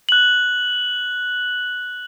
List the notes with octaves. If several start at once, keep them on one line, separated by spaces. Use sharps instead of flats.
F#6 F#7